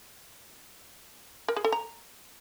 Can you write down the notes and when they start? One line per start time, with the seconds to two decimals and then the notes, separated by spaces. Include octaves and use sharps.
1.48 A#4
1.56 G#4
1.64 A4
1.72 A#5